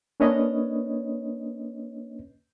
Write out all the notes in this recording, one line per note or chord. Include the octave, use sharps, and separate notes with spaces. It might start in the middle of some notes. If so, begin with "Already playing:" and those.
A#3 C#4 D4 B4 C#5 D#5